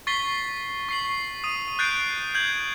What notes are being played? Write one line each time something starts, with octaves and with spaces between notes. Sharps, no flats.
C#6 A6 B6 C7 G7
C#6 C7 F#7
D#6 D#7
F#6 G6 A6 C7 D7
G6 G#6 F#7